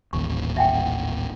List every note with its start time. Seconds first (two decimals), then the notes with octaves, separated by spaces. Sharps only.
0.13 D#1 A1 D#2 C#6
0.57 E5 F#5 G5